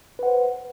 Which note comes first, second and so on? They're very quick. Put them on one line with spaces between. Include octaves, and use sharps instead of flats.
B4 F#5 C5